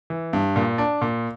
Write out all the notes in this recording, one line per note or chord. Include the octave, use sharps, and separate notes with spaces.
E3
G2
A#2
D4
A#2